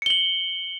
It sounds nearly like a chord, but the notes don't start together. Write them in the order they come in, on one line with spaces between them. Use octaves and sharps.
C#7 G7 F#7